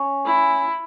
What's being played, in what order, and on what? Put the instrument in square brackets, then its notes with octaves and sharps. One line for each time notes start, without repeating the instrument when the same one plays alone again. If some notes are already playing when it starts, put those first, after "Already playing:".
Already playing: [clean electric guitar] C#4
[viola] E4